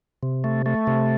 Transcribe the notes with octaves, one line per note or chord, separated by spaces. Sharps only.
C3
A3
A3
C3